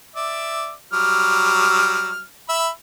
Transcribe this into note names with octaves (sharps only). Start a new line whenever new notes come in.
D5 E5
F#3 G3 F6
E5 B5